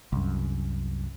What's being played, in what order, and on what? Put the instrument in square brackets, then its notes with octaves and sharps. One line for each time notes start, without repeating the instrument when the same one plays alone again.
[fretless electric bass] C2 F#2